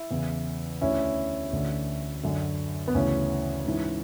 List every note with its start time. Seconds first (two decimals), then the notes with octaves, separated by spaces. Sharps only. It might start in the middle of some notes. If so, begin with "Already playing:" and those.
Already playing: E4
0.11 E2 C#3 E3
0.81 D2 D3 C#4 E4
1.53 D2 D3
2.23 F#2 D3
2.88 B3
2.95 D2 C#3 E3 C#4
3.66 G#2 E3